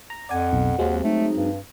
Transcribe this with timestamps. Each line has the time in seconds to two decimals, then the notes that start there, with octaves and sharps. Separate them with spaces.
0.10 A#5
0.29 F2 D5 F#5 G#5
0.53 B1
0.78 D#2 F#3 G#3 C4
1.04 A3 D#4
1.36 G2